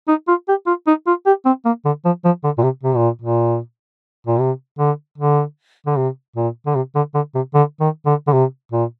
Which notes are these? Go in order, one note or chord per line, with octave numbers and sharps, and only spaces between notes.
D#4
F4
G4
F4
D#4
F4
G4
C4
A#3
D3
F3
F3
D3
A#2
C3
C3
A#2
A#2
A#2
C3
D3
D3
D3
C3
A#2
D3
C3
D3
D3
C3
D3
D#3
D3
D3
C3
A#2